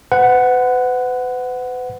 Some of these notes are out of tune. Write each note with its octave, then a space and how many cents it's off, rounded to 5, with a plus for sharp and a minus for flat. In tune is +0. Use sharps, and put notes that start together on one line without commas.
B4 +40 F#5 +0